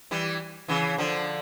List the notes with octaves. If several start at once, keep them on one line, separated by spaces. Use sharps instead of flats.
E3 G3
C#3 E3
D3 F3